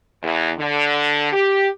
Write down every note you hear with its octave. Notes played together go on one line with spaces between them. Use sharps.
E2
D3
G4